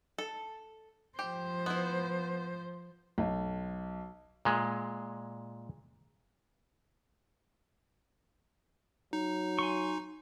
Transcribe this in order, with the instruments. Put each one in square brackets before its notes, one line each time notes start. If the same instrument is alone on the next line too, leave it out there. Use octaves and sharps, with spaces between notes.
[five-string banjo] A4
[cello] F3 C5 [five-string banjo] G4
[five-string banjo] B3 E4
[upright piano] B1
[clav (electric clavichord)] A#2 G#3
[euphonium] F#3 [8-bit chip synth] D#4
[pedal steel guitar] G#5 C6 C#6